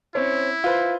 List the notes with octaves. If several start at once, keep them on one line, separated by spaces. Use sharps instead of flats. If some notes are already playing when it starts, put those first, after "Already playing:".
C4 C#4 E4 C#5
F4 B4 C5